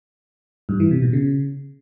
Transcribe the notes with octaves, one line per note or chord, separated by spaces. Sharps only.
G2
E3
C3
B2
C#3